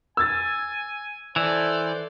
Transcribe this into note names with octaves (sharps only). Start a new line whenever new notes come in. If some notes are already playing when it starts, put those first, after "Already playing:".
G#5 E6 G#6 A6
E3 A4 C5 D5